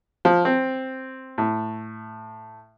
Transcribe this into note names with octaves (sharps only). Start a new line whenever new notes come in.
F3
C4
A2